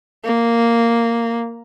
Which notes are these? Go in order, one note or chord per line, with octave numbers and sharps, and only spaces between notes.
A#3